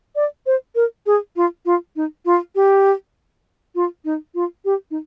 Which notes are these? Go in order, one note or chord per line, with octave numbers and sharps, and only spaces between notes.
D5
C5
A#4
G#4
F4
F4
D#4
F4
G4
F4
D#4
F4
G4
D#4